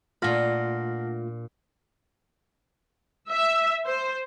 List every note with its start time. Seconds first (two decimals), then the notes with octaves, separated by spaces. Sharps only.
0.22 A#2 A3 D4 F4 F#5 B5 F6 A#6
3.30 E5
3.86 C5